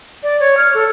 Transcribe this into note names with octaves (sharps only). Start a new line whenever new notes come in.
D5
C#5
F6
A4